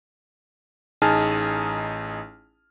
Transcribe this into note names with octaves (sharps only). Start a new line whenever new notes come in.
A1 D#4 G#4 G#5 A5 F6